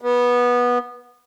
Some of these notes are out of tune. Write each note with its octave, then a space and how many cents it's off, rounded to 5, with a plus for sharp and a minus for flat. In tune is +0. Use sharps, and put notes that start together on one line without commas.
B3 -15